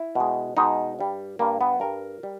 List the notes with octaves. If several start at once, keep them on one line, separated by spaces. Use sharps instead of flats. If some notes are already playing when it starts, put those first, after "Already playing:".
Already playing: E4
B2 G#3
B2 G#3 D#4
G2 G3
G2 G3 A#3
B3
G2 G3 A#4
G3